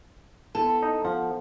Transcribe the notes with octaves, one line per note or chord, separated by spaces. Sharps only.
B3 E4 A4
D#4
F3 F#5